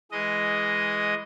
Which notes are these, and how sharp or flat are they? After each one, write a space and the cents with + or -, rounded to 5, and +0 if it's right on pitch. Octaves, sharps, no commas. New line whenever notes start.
E3 +0 G#3 +0 D#5 +0